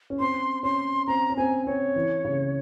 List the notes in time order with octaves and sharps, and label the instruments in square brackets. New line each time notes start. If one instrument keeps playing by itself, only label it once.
[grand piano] C#4
[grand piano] C4 [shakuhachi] C6
[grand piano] C#4 [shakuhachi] C6
[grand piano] C4 [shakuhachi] A#5
[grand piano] C#4
[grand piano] C4 [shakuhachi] G#5
[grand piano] C4 [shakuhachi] C#5
[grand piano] E3
C#3